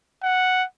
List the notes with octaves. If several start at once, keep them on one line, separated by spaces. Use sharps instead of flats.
F#5